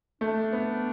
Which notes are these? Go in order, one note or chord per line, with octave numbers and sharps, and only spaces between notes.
A3 D4
B3